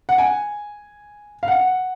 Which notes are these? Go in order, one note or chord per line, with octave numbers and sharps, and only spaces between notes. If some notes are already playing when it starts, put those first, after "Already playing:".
F#5
G#5
F5
F#5